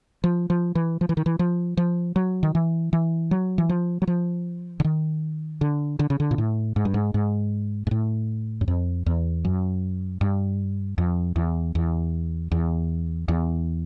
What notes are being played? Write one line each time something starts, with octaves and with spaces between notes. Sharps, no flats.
F3
F3
E3
F3
E3
D#3
E3
F3
F3
F#3
D#3
E3
E3
F#3
E3
F3
F#3
F3
D3
D#3
D3
D3
C#3
D3
A#2
A2
G#2
G2
G#2
G#2
G#2
A2
F#2
F2
E2
F#2
G2
F2
E2
E2
E2
E2